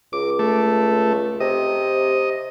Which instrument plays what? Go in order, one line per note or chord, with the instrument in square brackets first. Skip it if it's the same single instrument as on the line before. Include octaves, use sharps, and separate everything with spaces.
[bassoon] C#2 [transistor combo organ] D6
[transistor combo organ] A3
[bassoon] C3 [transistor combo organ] D#5